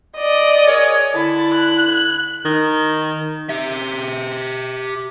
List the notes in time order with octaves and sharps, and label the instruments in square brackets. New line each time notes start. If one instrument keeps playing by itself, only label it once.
[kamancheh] D5 D#5
[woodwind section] G#4 A#4 C#5
[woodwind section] D3 E4 [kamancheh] A5
[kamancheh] F#6
[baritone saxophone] D#3
[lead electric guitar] G4 E5